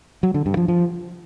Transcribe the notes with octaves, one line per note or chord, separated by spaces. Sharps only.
F#3
D3
G2
F3
F3